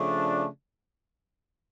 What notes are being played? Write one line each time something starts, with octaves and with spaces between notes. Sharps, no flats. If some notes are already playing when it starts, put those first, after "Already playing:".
Already playing: C#3 F3 A3 D4